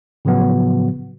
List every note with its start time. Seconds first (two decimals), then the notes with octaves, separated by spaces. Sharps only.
0.25 A2 C#3 F3 F#3 B3 F#4